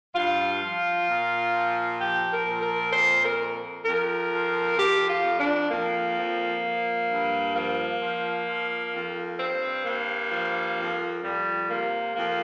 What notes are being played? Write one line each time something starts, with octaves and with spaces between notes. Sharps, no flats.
G2 F4
F3
A#2
F3
F3 G4
A#4
A#2
A#4
F2 C5
A#4
F2
F2 A#4
F3
F2 G4
F4
F2
D4
F2 A#3
F3
F3
G2
F3 A#3
F3
F3
F2
G2 C4
G2 A#3
F3
F2
F2 G3
C3 A#3
F2 A#3